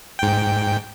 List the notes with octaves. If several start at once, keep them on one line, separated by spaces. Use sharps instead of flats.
G#2 G5